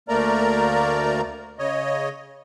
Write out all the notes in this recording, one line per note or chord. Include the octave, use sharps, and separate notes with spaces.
D2 A3 A#3 A#4 D5 A#5
C#3 C#5 D#5